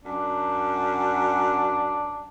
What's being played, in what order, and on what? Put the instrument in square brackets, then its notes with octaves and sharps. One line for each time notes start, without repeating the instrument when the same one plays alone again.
[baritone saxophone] F#2 [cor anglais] D4